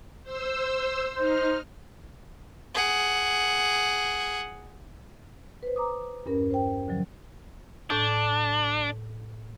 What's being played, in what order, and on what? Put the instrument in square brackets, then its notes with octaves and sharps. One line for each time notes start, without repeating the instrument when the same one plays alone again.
[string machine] C5 E6
[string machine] D#4 F6 [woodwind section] C5
[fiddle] G#4 F#5
[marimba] B4 C5
A#5 D6 D#6
E2 G2 C#4 A#4
C5 G5
D3 F3 F#3
[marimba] A2 G6 [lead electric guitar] D4